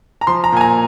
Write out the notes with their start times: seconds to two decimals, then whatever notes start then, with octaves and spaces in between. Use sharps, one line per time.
0.21 A#5
0.27 F3 C6
0.44 A#5
0.53 A#2 G#5
0.61 A#5